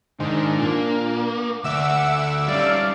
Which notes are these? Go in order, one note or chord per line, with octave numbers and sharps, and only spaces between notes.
G#2 D#3 G#3 D4
A#2 A#3
D2 E5 F#5 D6 E6
G3 C#4 D5 F5